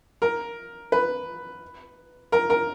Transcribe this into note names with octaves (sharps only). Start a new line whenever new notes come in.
A#4
B4
A#4
A#4